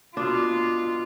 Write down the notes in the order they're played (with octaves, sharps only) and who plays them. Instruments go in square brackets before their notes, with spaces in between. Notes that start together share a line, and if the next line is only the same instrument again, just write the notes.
[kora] B2 D4 [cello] F4